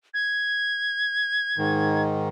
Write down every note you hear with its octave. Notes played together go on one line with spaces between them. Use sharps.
G#6
G#2 D#3